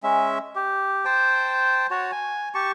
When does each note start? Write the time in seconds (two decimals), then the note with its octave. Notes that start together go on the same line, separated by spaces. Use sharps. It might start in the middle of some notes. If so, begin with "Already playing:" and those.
0.03 G#3 C#4 E5
0.56 G4
1.05 C5 G5 A5
1.91 F#4 C#5 A5
2.12 G#5
2.55 G4 A5 C#6